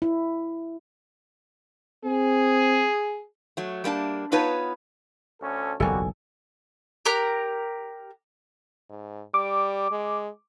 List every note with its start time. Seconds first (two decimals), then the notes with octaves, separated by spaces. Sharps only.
0.02 E4
2.05 C4 G#4
3.57 F#3 A3
3.84 G3 A#3 D4 A5
4.32 B3 D#4 F4 B4 C#5 A5
5.41 D2 C#4 A4
5.80 F#1 B1 E2 G3 A#3 F#4 A4 G#5
7.06 G4 A#4 A#5 F#6
8.90 G#2
9.34 G3 D6
9.91 G#3